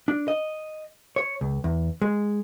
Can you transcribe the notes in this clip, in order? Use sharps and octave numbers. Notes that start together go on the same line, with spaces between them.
D4
D#5
C#5
C#2
E2
G#3